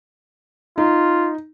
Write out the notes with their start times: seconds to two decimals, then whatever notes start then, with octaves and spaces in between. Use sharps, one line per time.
0.78 D#4 F4